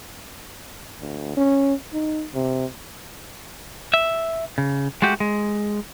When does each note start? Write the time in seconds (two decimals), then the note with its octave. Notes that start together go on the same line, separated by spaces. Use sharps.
1.00 D2
1.36 C#4
1.93 D#4
2.34 C3
3.94 E5
4.58 C#3
5.02 G#3 A3 F#4 G4
5.20 G#3